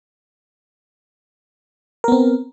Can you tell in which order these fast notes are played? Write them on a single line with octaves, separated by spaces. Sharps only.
A#4 B3 C4